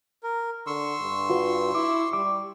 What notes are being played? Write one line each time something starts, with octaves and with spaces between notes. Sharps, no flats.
A#4
D3 C6 C#6 E6
G2
F4 F#4 B4
E4 D6
G3 D6